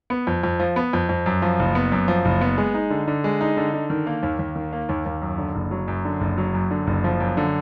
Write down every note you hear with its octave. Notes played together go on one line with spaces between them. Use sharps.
B3
F2
F2
F3
B3
F2
F2
F#2
F3
F#1
B3
F#2
F3
F#1
B3
G#3
D#4
D3
D3
G#3
D#4
D3
D3
D#3
A#3
D#2
D#2
D#3
A#3
D#2
D#2
F#2
D3
F#1
F#3
F#2
D3
F#1
F#3
F#2
D3
F#1
F3
F#2
D3